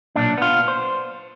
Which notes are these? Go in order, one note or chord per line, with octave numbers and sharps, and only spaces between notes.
B1 A#2 D4
B3 F4
C5